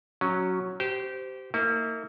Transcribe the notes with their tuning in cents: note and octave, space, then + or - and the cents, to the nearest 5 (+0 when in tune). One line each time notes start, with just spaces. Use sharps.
F#3 +0 C#4 +0
G4 -20 C5 -20
A#3 -30 E4 -45